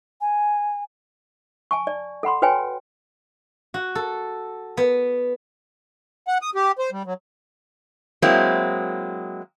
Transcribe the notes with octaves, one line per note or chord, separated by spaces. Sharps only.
G#5
G#5 A5 C#6
D5
A4 F#5 B5 C6
F#4 B4 C#5 G5 G#5
F#4
A4
B3
F#5
D#6
G4
C5
G3
F#3
F#3 G#3 A#3 C4 E4